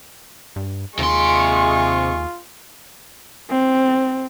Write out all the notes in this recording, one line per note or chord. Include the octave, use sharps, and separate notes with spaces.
G2
D#2 C3 G#3 F4 C6 C#6
C4